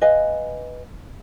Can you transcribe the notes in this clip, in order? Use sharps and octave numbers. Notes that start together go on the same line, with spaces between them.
B4 D#5 F5 G#5